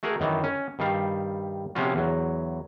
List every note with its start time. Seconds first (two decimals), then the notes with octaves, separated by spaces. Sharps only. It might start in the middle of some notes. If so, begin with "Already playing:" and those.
0.03 A3 F#4 G#4 A#4
0.20 F#2 D#3 E3
0.44 C#4
0.79 G2 D#3 G3 F5
1.75 C3 F3 B3 C#4 F4 F#4
1.95 E2 F#3